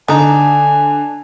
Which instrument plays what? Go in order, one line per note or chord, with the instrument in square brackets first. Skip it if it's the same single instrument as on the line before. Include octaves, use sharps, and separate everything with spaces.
[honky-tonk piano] D3 [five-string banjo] D4 D#4 [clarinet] G#5